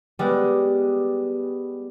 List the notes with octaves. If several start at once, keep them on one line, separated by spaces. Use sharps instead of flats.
G3 G#3 B3